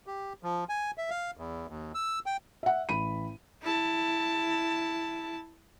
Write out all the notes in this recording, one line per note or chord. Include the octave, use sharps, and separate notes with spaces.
G4
F3
G#5
E5
F5
E2
D#2
E6
G5
E5 F#5
A1 B5 D#7
E4 A5